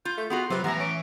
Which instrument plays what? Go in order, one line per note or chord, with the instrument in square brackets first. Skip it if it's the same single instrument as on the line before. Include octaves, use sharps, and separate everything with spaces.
[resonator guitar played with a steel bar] F4 [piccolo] G6
[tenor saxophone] A3
[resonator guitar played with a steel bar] B3 F4 F#4 [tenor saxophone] G#4 [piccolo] C6
[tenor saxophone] C3 [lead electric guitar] F#3 [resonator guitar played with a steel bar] F4 B4
[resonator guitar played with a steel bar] A2 E5 [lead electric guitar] E3 G#5 [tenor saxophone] B3 [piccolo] A#5
[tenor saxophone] C#4 [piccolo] D7